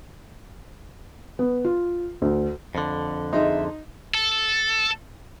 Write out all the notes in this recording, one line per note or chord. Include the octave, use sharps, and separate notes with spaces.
B3
F4
D2
F2 D3
D#4 G#4 D#5 E5 C6
A4